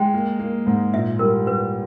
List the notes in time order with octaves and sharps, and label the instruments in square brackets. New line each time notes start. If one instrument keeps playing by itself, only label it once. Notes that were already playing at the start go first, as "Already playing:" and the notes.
Already playing: [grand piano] G#3 [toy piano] G5
[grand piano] A#3
A#3
G#2
[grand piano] A#2 [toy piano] E5
[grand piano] G3 [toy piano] A#4
[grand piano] G3 [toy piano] B4